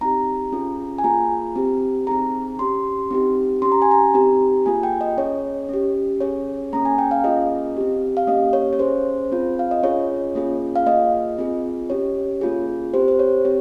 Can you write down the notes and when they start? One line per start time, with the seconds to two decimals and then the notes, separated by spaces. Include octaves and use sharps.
0.01 C4 D#4 G4 A#5
0.52 C#4 F4 G#4
0.98 G#5
1.04 A#3 F4 G#4 A#5
1.56 C4 G4
2.07 C4 D#4 G#4 A#5
2.59 C#4 G4 C6
3.11 C4 D#4 G4
3.62 C#4 G4 C6
3.72 A#5
3.82 G#5
3.91 A#5
4.14 C4 D#4 G4
4.66 A#3 F4 G#4 G#5
4.83 G5
5.01 D#5
5.17 C#4 G#4 C#5
5.69 C#4 G4
6.20 C#4 G#4 C#5
6.73 A#3 C#4 G#4 A#5
6.85 G#5
6.98 G5
7.11 F5
7.24 A#3 C#4 F4 G#4 D#5
7.77 C4 G4
8.17 F5
8.27 A#3 C#4 G4 D#5
8.53 C#5
8.73 C#5
8.79 C#4 G#4 C5
9.32 C4 F4 G#4
9.59 F5
9.71 D#5
9.83 C#4 F4 G#4 C#5
10.35 A#3 C#4 F4 G#4
10.76 F5
10.86 A#3 F4 G#4 D#5
11.38 C4 F4 G#4
11.90 C#4 G4 C#5
12.41 A#3 C#4 F4 G#4
12.94 C4 G4 C5
13.08 C5
13.19 C#5
13.45 C4 G4 C#5